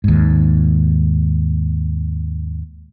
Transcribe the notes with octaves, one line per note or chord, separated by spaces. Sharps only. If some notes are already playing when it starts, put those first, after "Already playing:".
D#2 G#2